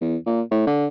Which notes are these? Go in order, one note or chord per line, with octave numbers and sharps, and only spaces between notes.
E2
A#2
A2
D3